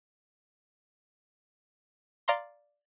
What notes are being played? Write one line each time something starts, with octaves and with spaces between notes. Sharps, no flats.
D5 F5 A#5 C6